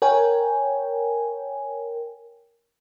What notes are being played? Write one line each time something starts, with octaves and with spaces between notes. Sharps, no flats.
A#4 C#5 G5 G#5